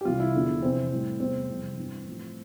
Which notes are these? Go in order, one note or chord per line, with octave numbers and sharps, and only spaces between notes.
G4
C2 C3 E3 G3 F4
E4
E2 D3 F3
F2 C3 E3 C4
A2 E3 G3
E2 C3 G3 C4
F2 C3 E3 G3
G2 E3 G3
A2 F3